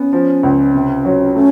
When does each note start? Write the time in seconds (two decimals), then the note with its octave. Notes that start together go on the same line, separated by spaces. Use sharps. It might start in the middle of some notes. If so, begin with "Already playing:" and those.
Already playing: B3 C#4
0.13 F3
0.43 C#2
0.74 C3
1.05 F#3
1.35 A3 C#4